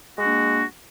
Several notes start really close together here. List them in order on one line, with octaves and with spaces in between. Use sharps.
G#3 F#4 A#3 D4